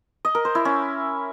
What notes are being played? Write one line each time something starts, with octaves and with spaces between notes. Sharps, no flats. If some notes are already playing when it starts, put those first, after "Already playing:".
D#5
A#4
C5
E4
C#4